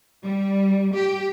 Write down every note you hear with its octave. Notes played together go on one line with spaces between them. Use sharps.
G3
G4